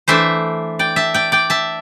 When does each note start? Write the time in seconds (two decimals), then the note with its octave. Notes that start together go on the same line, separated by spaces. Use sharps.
0.08 E3 A3 D4 C5 E5
0.79 D5 G5
0.96 E5 A5
1.14 D5 G5
1.32 D5 G5
1.50 E5 A5